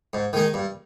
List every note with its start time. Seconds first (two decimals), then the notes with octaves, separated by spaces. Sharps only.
0.13 G#2
0.33 D#3 G#3 D#4
0.54 G2